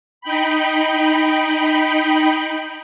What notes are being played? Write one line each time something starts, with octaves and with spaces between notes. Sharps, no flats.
D#4 G5 B5